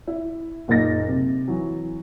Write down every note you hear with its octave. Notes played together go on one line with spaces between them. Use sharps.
E4
F#1 A#2 A#3 D#4 A6 A#6
C3
E3 F#3